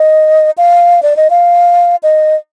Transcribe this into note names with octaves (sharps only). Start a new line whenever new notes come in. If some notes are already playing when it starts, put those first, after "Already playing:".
Already playing: D#5
F5
D5
D#5
F5
D#5